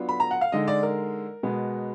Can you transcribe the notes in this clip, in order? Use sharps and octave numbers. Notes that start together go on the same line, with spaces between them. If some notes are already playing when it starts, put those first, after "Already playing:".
Already playing: F#3 B3 D4 F4
B5
A#5
F#5
F5
D3 G#3 D#4 D#5
D5
A#4
B2 G#3 B3